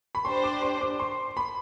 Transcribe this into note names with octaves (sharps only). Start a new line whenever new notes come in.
B5
D4 G4 C5 C6
D6
C6
D6
C6
B5